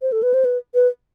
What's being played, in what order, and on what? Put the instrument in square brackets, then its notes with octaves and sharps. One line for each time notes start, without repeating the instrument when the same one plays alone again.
[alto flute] C5
A4
B4
C5
B4
B4